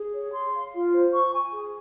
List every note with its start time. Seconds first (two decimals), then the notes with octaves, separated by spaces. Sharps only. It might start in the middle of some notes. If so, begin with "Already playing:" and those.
Already playing: G#4
0.13 C#5
0.33 C6
0.53 F5
0.73 F4
0.93 C5
1.13 C#6
1.33 G#5
1.52 G#4